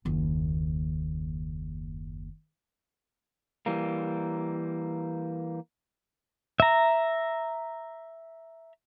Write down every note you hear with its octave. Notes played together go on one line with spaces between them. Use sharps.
F#1 D#2
E3 G3 A#3
E5 A#5